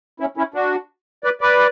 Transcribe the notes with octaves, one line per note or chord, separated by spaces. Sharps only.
C#4 E4
C#4 E4
D4 F#4
B4 D5
B4 D5